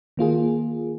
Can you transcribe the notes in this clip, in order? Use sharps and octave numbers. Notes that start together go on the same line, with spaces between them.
D#3 A#3 F4 G#4